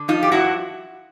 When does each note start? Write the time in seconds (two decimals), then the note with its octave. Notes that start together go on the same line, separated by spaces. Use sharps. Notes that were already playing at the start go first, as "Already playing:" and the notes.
Already playing: D3
0.08 F3 D#4 F4
0.23 G4
0.31 G2 E4 F#4